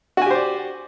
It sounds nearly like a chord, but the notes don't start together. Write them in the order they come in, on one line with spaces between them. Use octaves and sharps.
F#4 G#5 G4 C5 D5